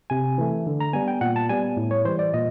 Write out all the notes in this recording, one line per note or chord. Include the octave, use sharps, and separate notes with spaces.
C3 G#5
E3 A3
D3
A#5
G3 B3 G#5
G5
A#2 F#5
A5
G3 B3 G#5
A2
C#5
E3 G3 C5
D5
A#2 D#5